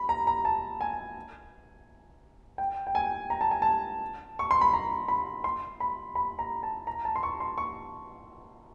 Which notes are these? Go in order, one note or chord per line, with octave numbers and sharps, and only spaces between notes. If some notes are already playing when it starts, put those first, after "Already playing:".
Already playing: B5
A#5
A#5
A5
G#5
G5
G5
G#5
A#5
A5
G#5
A5
C#6
C6
B5
A#5
B5
C6
B5
B5
A#5
A5
A#5
A5
C6
C#6
C6
C#6